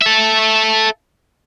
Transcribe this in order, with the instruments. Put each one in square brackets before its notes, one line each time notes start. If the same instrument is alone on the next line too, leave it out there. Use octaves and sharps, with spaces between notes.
[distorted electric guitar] A4 E5